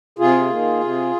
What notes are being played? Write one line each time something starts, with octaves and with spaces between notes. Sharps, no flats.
C3 F4 G#4
D#3 A#3
C3